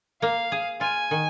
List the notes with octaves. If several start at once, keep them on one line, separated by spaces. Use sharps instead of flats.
A#3 F5
G#4
F4 G#5
D#3